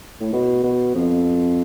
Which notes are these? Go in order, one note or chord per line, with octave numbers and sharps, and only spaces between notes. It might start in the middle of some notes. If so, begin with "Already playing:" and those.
A2
B2
B2
F2